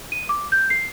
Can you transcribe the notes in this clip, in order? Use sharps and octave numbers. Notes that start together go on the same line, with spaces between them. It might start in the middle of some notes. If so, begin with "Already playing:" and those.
D#7
D6
G6
C7